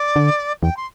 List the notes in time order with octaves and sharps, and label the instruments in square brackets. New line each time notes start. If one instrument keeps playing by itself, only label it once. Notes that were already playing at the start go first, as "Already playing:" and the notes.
Already playing: [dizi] D5
[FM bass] D3
[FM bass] E2 [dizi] G5
[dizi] C6